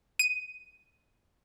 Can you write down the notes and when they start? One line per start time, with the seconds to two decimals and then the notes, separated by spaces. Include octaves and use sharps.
0.19 D#7